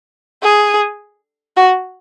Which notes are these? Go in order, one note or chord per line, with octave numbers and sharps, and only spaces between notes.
G#4
F#4